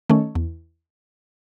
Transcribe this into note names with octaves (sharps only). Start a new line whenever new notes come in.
D#3 A3 C#4
E2